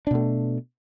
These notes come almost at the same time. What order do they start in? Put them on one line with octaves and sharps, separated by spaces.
D4 B2 A3